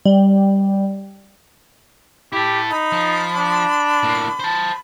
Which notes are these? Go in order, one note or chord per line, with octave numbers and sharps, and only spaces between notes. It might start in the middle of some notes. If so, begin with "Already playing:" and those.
G3
E4 G4 A4
D#4 B5
F3
D4
A2 A#3
C5 A5